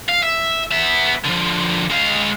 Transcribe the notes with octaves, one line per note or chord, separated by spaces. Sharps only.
F5
E5
B3 E5
D3 F3
G#3 F5